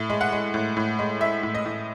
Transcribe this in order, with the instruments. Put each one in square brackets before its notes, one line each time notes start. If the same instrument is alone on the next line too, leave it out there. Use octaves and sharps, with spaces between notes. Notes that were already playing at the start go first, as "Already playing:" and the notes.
Already playing: [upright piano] A2
G#3
F#5
G#3
A2
A2
G#3
G#3 E5
A2
D#5
A2